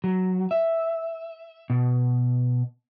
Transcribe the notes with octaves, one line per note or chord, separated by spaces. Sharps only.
F#3
E5
B2